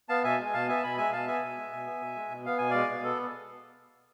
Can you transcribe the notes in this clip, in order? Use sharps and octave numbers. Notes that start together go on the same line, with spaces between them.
B3 F5 A5
B2 E5 G#5
G#3
G#5
B2 F5 A5
B3 E5 G#5
A5
B2 G#5 B5
G#3 E5 G#5
B2 F5 A5
B3 E5 G#5
B2
G#3
B2
B3
B2
G#3
B2
B3 F5
B2 G#5
G#3 D5 F5
B2
B3 A4